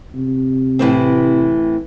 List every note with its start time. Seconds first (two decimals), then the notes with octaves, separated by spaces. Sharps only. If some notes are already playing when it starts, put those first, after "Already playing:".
0.15 C3
0.79 A2 E3 C4